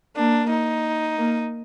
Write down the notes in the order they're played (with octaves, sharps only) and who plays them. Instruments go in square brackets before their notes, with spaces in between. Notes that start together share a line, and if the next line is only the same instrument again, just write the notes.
[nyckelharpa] A#3 [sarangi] D4
[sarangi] D#4
[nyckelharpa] A#3